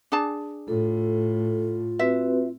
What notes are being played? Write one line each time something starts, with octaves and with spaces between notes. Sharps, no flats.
D4 G#4 A5
A2 F4 A4
C4 F#4 B4 E5